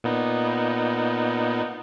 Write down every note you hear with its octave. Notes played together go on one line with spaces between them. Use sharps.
A#2 B3 D#4